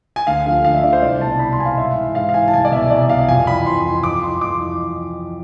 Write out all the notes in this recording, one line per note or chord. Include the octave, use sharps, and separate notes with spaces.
G#5
D2 F5
D3 F3 F5
D2 F5
E5
D3 F3 D5
C5
C2 D5
B2 A5
C2 B5
C6
B2 G#5
F5
G#2 E5
E3
G#2 F5
F5
E3 G#5
A5
C2 G#5
D5
B2 E5
C2 D5
B2 F5
F2 G#5
E3 B5
F2 C6
E3
F2 D6
E3 C6
F2 D6
E3